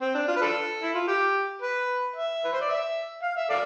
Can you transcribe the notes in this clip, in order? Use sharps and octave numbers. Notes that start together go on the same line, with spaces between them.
C4
D4
F4
B4
D4 F4 A4
E4
F4
G4
B4
E5
B4
C5
D5
E5
F5
E5
A4 D5 F5